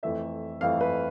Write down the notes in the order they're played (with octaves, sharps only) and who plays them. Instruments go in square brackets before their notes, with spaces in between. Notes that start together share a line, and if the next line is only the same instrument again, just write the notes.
[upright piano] F2 E3 A3 E5
F2 E3 A3 F5
B4